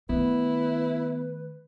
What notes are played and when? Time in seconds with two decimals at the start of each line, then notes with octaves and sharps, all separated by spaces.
0.09 D#3 A3 B3 E4 B4